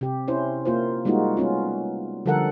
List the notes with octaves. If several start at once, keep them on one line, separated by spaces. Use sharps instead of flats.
C3 G4
C#4 E4 C5
A#3 F4 C5
G3 G#3 A#3 D#4 F4 F#4
G3 B3 C#4 F4
D3 F3 G3 A4 A#4 F#5